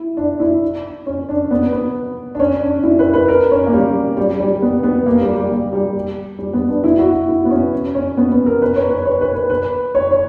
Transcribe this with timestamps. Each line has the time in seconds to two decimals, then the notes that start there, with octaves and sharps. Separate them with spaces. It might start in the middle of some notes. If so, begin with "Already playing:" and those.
Already playing: E4
0.17 D4
0.40 E4
1.06 C#4
1.29 D4
1.51 B3
1.73 B3
2.35 D4
2.40 C#4
2.62 D4
2.83 E4
2.99 B4
3.14 B4
3.28 A#4
3.51 C#4
3.67 A#3
3.73 G3
4.17 G3
4.40 G3
4.62 B3
4.83 B3
5.06 A#3
5.21 G3
5.36 G3
5.51 A#3
5.73 G3
6.39 G3
6.53 B3
6.69 D4
6.84 E4
6.98 F#4
7.13 F#4
7.28 E4
7.45 B3
7.51 C#4
7.95 C#4
8.17 B3
8.32 B3
8.46 A#4
8.62 B4
8.76 C#5
8.90 B4
9.06 C#5
9.21 B4
9.35 B4
9.50 B4
9.95 C#5
10.11 C#5